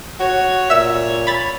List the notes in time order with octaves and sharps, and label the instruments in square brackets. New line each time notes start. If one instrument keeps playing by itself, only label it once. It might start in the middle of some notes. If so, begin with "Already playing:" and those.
[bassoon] F#4 [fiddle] C#5
[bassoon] A#2 [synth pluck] E5 E6
[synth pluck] B5 A6